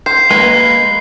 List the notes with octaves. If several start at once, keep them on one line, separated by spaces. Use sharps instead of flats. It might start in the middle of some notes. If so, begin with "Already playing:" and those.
C5 C7
G#3 A#3 B4